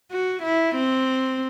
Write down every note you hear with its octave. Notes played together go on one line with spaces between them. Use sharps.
F#4
E4
C4